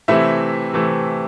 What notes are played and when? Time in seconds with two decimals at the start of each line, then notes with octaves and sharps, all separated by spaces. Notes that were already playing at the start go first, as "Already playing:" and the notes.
0.08 C3 E3 A3 C4 E4 E5
0.73 C3 E3 A3 C4